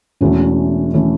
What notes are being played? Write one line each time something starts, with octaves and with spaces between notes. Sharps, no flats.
E1 E2 E3 A3 C#4 F#4
E3 A3 C#4